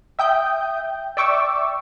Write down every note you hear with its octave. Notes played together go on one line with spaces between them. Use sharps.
E5 G5 D#6 G6
D5 E5 G5 C#6 D6 E6